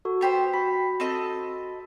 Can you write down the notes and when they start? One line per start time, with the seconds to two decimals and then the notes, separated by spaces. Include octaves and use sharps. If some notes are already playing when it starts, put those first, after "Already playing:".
0.05 F#4 A4
0.21 B3 G4 C5
0.54 F#4 B5 B6
1.00 C4 A4 D#5